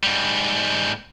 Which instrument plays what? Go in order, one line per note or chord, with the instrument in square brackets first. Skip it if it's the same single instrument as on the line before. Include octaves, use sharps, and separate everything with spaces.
[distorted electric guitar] G#2 G3